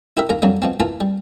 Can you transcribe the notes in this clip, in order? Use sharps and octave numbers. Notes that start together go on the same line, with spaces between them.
E4 G4 A#4 E5
D#2 A#3 A#4 A#5
F2 D3 F#3 G3 A#3
B2 F3 C4
E3 A#3 F4 A5
G3